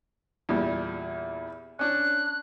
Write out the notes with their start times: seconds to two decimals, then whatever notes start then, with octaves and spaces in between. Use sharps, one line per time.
0.49 E2 A#2 G3
1.79 C#4 D4 F#6